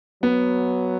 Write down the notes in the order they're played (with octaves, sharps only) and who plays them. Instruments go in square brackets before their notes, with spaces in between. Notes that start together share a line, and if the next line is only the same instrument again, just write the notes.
[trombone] F#3 [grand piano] B3